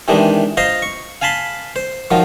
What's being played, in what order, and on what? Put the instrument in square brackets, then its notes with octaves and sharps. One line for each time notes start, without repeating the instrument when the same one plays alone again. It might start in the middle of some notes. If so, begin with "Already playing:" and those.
[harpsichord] C3 D#3 E3 G#3 D4
F4 C5 D#5 A#5 C6
C#6
F5 G#5 A5 B5 C6
C5
D#3 F3 F#3 F4